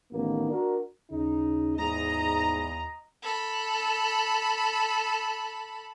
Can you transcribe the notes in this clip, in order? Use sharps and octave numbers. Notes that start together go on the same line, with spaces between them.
A1 D#3 A#3 B3
D4 F#4 A#4
D#2 C#3 D#4
E2 G#2 D#5 A#5
A4 B5